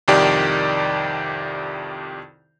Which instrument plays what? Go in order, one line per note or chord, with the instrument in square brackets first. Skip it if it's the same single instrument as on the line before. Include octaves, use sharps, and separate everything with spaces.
[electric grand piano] C2 F2 D#3 G4 D5